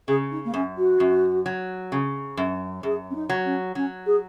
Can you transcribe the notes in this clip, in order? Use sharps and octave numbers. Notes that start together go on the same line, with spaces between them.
C#3 G#4
D#4
A#3
F#2 C#4
F#4
F#2
F#3
C#3
F#2
F#2 G#4
C#4
D#4
F#3
C#4
F#3 C#4
G#4